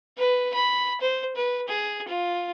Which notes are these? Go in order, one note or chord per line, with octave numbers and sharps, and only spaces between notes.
B4
B5
C5
B4
G#4
F4